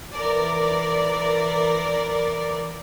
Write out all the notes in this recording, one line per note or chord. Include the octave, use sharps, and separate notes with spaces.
E3 A#4 D5